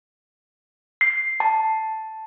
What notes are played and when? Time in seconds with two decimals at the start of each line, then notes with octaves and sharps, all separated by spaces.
1.01 C7
1.40 A5